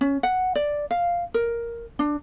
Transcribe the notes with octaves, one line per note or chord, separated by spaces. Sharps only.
C#4
F#5
D5
F5
A#4
D4